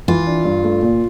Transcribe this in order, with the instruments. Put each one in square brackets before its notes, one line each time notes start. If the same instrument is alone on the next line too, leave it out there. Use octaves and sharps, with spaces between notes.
[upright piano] E3 [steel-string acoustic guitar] F4
[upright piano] D4
G2
A3
A#2